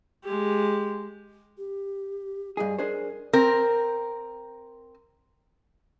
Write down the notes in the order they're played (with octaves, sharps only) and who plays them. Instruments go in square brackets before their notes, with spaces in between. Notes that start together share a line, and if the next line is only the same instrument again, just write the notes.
[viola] G#3 G4
[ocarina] G4
[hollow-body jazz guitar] G2 G#4 [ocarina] D#5
[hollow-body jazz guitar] D4 G#4 C5 [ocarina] A#4
[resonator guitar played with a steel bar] C4 A#4